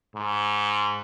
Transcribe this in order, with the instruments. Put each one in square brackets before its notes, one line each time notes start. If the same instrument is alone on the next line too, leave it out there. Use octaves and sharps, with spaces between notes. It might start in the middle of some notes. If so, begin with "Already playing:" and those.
[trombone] G#2